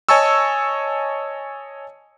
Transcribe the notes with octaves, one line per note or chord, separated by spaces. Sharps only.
C#5 D#5 G#5 A5 C#6 E6